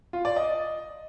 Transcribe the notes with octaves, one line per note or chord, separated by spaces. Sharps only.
F4
D5
D#5